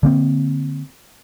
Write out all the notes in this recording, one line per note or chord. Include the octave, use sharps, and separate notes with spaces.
D3 A#3 C4